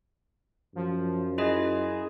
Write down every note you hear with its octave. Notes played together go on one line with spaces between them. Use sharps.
F#2 F3
E4 F4 G#4 D#5